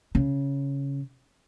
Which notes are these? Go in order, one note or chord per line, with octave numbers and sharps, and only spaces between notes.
C#3